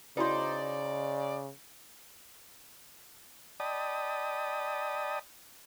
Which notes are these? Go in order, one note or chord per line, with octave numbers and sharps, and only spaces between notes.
C#3 D#4 E4 F#4 B4 C5 D5
D5 D#5 G5 A5 B5 D#6